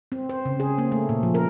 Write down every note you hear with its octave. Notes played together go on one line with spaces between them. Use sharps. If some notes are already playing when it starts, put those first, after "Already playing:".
C4
C5
C#3
G#4
A#3
A3
A#2
F3
A#4